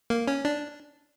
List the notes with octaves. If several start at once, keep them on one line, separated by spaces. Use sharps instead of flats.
A#3
C#4
D4